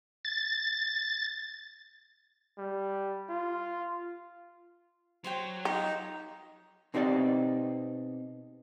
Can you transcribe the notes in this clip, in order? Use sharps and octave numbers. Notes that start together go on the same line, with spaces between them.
A6
G3
F4
F#3 C5 C#5 G5
D#4 F4 G4
B2 C4 D#4 G4 C#5 D5